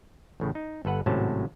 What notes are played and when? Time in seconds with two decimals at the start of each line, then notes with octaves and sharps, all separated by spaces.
0.40 A1 A2 C#3
0.55 D#4
0.85 G1 A4 B4 F#5
1.06 G#1 A2 C3 F#3 C#4 A5